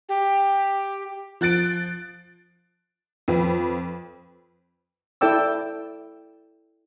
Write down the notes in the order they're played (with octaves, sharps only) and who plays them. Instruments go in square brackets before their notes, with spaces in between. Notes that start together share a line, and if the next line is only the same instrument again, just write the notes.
[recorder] G4
[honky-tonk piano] F3 F#6 A6 D7
F2 B4
[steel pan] E4 A4 D5 G5 D6 E6